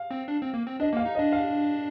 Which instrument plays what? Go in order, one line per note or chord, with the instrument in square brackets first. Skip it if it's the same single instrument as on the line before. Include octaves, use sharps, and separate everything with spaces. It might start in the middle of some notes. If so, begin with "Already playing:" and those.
Already playing: [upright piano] F5
[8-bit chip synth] C4
D4
C4
A#3
C4
[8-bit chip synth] D4 [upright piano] D#5
[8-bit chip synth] A#3 [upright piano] F5
[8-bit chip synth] D#4
[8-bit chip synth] D4 [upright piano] D#5
[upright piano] F5